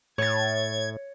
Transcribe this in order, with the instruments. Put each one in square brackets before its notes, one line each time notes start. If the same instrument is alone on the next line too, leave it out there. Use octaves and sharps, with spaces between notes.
[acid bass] A2 [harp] C#5 A6 [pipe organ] G#6